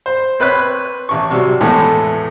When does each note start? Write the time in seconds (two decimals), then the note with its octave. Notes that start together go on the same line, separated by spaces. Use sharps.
0.06 C5
0.40 C4 B4 C#5 F#6
1.09 A1 C#6
1.30 C3 F#3 G3
1.61 E2 A2 G#3 A3 B3